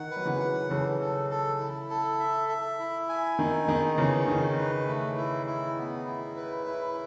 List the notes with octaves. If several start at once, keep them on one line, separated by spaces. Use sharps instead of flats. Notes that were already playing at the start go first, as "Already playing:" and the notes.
Already playing: D#3 F#5
B4
F#3
C#3 E3
F#5
C#3 E3 A4
A4
A4
E4
A4
E5
E5
E4
G#5
D#3 D#4
D#3 G#4
C#3 E3 D#4
D#3 C#4
B4
A3
E4
E4
B3
E4
B4
E4